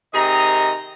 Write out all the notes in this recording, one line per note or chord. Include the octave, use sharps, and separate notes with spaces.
C3 D#3 G#4 D#5 A#5